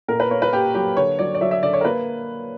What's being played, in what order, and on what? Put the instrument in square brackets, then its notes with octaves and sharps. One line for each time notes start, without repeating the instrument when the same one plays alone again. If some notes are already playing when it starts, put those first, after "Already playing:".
[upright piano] A#2 A#4
B4
A#3 C#5
B4
A#3 G4
F#3 G4
D3 C#5
F#3 D5
D5
F#3 E5
E5
D3 D5
C#5
A#4
A#3 B4